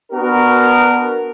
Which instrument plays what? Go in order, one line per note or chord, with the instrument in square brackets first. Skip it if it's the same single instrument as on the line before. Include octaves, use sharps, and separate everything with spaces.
[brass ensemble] B3 D4 F#4 A#4